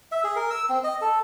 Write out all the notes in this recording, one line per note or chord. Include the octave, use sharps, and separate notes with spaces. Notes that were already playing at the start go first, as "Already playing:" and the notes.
E5
G#4
A#4
E6
C4
D#5
A4